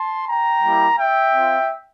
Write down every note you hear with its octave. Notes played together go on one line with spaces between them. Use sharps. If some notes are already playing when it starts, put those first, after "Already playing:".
Already playing: A5 C6
G5 A#5
G3 A#3 E4 G4
E5 G5
C4 F4